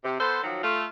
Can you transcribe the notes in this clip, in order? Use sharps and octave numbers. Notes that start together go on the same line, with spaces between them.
C3
B3 A4 C5
D#3 F3 F#3
A3 F4